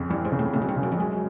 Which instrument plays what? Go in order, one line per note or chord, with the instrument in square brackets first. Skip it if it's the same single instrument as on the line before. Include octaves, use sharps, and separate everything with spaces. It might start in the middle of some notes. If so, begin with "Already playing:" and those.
Already playing: [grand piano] F2 C#3
[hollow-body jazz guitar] G2 [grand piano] E3
[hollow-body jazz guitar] G#2
[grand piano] C#3
[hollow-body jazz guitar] A2
[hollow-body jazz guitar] A2 [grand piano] C#3
[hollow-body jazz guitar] F#2
G2
[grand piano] C#3
[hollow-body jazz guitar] F#2
F2
[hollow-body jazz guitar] F#2 [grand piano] G#3